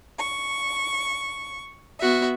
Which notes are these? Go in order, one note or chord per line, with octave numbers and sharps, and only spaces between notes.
C#6
B3 F#4 E5